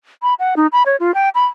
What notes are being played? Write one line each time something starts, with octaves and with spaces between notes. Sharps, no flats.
B5
F#5
D#4
B5
C#5
F4
G5
B5